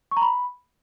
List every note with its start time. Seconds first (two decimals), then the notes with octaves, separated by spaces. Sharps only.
0.11 C#6
0.17 A#5
0.22 B5